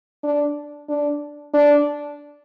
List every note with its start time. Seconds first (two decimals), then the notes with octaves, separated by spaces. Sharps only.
0.24 D4
0.89 D4
1.54 D4